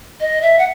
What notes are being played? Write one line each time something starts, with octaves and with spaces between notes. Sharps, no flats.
D#5
E5
F#5